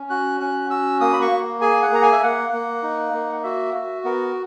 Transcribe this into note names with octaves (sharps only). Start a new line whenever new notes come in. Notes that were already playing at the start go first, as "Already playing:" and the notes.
Already playing: C#4
F#4 F#6
C#4 F#6
F#4 E6
A#3 D#6
B5
C#6
A#3
G#4 G#5
F#5
A#3 A#5
G#5
E5
A#3 F#5
A#3
D#4
A#3
F#4 E5
F#4
B3 A#4